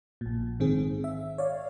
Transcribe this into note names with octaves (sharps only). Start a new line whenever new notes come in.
A#1 A#2
G#2 D#3 C4 G#4
E5
C#5 D5 F5